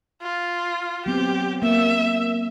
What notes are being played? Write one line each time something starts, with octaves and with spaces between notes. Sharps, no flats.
F4
F#3 B3 C4 G4
A#3 E5